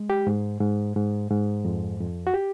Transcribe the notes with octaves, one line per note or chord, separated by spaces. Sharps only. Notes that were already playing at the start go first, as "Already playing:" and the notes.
Already playing: G#3
G4
G#2
G#2
G#2
G#2
F2
F2
F#4
G4